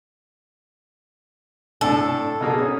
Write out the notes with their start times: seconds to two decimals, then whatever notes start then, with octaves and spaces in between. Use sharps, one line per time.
1.81 A2 D4 A4
2.41 B2 A#3 G#4
2.58 C#4 D#6